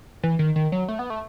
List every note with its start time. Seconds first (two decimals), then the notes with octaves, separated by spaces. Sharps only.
0.23 E3
0.39 D#3
0.56 D#3
0.72 F#3
0.88 A3
0.99 B3
1.10 A3